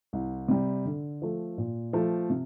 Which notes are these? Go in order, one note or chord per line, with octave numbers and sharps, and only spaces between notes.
C2
C3 G3
D3
F3 A3
A#2
F3 A3
C3